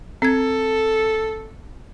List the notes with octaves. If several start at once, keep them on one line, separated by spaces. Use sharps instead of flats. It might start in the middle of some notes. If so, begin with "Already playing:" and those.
C4 A4 G#6